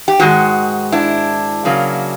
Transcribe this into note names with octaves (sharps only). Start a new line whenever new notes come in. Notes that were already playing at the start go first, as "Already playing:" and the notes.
G4
G#2 D#3 G#3 F#4
D4 E4
C#3 F#3 A#3